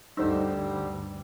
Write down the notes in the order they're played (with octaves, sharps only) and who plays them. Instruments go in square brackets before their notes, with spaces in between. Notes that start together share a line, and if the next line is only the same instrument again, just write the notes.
[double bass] D2 G2 [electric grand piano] D3 C5 E6 [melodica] G3 [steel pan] D#4